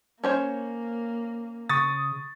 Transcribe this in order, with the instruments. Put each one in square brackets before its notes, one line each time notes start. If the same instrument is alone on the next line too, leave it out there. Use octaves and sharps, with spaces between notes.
[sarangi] A#3 [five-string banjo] C#4 C5 C#5
[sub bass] C#3 [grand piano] C#6 D#6 A6